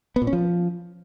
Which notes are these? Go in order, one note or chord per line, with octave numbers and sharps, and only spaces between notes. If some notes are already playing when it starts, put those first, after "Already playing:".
B3
A#2
C#4
F3